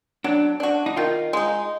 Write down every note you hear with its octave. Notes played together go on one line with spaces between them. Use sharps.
F#3 D4
D4 F#4
D#4
D#3 F4
G#3 D#4